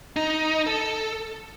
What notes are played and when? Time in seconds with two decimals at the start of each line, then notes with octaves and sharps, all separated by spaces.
0.16 D#4
0.67 A4